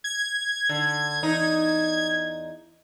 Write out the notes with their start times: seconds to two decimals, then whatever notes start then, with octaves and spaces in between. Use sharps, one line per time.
0.04 G#6
0.69 D3
1.23 E2 D#4